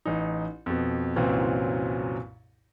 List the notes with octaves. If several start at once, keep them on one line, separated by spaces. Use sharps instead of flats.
A1 D#4
F2 B2
C2 F#2 A#2 E3 F#3 C4